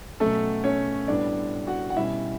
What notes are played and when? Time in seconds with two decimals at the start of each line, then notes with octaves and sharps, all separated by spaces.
0.20 B2 F#3 A3 C#4 A4
0.64 C#4 C#5
1.08 A2 G3 B3 D4 D5
1.67 F#4 F#5
1.90 F#5
1.96 B2 G3 C#4 E4 E5